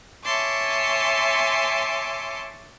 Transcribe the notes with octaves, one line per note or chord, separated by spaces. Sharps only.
C#5 E5 G#5 A5 C6 D6